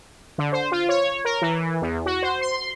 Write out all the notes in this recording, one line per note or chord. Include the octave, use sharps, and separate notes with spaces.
D3
C5
F4
C#5
A#4
E3
E2
F#4
C5
C6